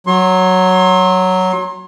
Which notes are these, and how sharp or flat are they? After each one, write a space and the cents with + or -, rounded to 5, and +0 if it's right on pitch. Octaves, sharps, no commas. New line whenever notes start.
F#3 +0 C6 +35